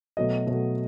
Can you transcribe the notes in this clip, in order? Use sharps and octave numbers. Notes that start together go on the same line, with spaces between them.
B2 F#3 A3 D#5
B2 F#3 A3